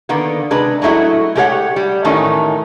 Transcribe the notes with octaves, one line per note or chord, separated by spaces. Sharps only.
D3 D#3 A#3 B3
C3 G#3 D4 B4
F#3 G#3 A3 E4 F#4
G#3 A3 G4 A#4 C#5 F#5
G3
A2 D#3 E3 A3 C#4 D#4